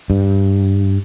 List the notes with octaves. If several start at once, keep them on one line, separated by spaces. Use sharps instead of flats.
G2